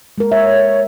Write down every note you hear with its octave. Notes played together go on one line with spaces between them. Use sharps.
G#3 A#4
C#5 E5